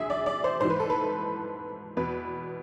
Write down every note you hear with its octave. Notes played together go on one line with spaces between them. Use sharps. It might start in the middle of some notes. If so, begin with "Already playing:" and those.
Already playing: D2 D3 G#4 E5
D5
D5
C5
G#2 E3 C5
B4
A4
B4
E2 B2 B4